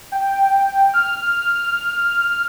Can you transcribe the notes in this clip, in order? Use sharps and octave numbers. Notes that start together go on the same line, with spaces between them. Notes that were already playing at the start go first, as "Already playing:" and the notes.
G5
F6